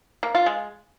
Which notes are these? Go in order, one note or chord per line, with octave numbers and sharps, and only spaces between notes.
A#3
F4
G#3